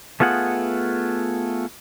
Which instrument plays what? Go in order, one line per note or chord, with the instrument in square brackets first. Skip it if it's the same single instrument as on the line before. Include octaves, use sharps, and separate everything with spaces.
[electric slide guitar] A3 B3 F4 G#4 F#5